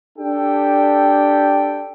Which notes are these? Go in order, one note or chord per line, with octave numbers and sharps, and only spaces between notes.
D4 G4 A4 G5